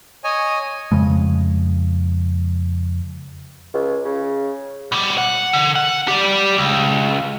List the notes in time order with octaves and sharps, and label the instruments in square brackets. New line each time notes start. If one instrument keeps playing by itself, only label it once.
[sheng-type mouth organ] C#5 D#5 G#5
[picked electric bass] F2 C#3 G#3
[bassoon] C#2
C#3
[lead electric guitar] B2 G3
F#5
D3
F#5
G4 D5
C#2